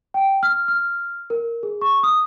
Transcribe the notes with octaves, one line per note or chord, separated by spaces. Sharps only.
G5
F6
F6
A#4
G#4
C#6
D#6